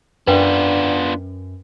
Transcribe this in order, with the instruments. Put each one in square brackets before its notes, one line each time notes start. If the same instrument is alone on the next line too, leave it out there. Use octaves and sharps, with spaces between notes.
[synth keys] F#2 [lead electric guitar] B3 F4 [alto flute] D4 [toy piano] B4 G5